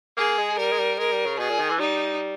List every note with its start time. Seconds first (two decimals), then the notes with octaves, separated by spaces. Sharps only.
0.17 A#3 G#4
0.38 G#3
0.58 G3 A#4
0.72 G#3
0.79 G3
0.99 G#3 A#4
1.12 G3
1.26 C#3
1.39 B2 G#4
1.50 A#2
1.59 D#3
1.70 E3
1.79 G3 D#4